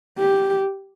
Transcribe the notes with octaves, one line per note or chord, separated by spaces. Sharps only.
G4